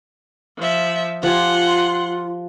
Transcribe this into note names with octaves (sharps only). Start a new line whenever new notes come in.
F3 E5
F3 F4 G4 F#5 G#5 C6